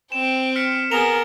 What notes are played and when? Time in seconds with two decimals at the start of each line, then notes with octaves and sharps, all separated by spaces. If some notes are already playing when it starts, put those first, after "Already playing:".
0.12 C4 G5 E7
0.56 F6 B6 C#7
0.91 B3 G#4 A#4 E7 F7 G7